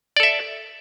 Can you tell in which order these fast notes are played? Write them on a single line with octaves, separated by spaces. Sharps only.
D5 A4 E5